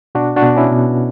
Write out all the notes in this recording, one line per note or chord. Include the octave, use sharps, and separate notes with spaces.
B2 D4 F#4
D4 F#4
B2
C#4 E4
B2